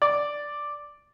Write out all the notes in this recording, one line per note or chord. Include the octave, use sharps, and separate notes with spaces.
D5